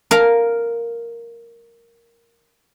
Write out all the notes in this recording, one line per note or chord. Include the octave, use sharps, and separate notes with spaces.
A#4 F5